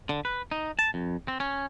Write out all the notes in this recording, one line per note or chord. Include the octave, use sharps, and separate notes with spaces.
D3
B4
D#4
A5
F2
C4
C#4